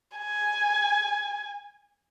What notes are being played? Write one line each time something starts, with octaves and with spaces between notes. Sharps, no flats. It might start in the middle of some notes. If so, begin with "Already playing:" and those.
G#5